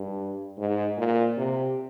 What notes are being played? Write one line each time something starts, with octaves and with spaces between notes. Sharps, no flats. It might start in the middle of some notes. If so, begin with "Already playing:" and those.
Already playing: G2
G#2
A#2
C3